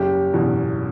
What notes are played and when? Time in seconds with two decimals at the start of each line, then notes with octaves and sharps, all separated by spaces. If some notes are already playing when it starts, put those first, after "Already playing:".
Already playing: F#1 G4
0.33 E2 B2